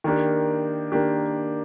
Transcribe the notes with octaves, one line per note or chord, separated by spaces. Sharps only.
D#3 A#3 D4 G4
D#3 A#3 D4 G4